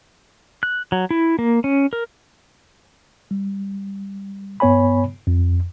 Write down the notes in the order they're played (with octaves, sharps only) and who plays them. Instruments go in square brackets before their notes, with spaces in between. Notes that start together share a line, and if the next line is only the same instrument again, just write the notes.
[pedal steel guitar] F#6
F#3
E4
A#3
C#4
A#4
[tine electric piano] G3
G2 B3 C#5 G#5 B5
F2